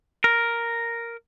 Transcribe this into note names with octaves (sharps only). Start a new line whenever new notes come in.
A#4